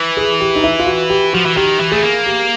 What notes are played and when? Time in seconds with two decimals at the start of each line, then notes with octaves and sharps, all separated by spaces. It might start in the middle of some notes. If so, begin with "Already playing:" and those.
Already playing: E3
0.17 G#4
0.41 G4
0.56 D#4
0.64 E4
0.80 F4
0.87 F#4
1.10 G4
1.33 F3 F#4
1.45 E3
1.56 D#3 G4
1.80 E3
1.92 A3 G#4
2.04 A#3
2.26 G4